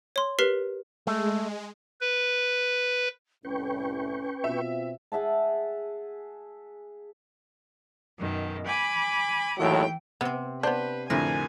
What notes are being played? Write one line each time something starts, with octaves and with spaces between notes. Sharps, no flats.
C#5 C6
G4 A#4 B4 F6 B6 C7
G#3 A3
B4
C2 A2 C#4 B4 G5 C#6
B2 C4 F4 E5
G#4 E5 F#5 A5
F#2 B2 D#3
G#5 B5 D6
D#2 A2 E3 F#3 G5
C3 B3 C4
B3 D4 B4 C5 G6
F2 A2 D3 A#4 G#5